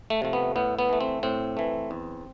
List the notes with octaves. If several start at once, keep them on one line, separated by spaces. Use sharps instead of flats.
A3
C3 F3 A3
B3
A2 B3
B3
E3 A3
C4
A2 C4
E3 A3
E2